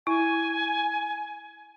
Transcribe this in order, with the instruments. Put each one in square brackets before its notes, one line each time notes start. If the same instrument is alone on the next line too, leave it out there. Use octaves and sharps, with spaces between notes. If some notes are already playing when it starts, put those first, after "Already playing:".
[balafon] E4 [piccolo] G#5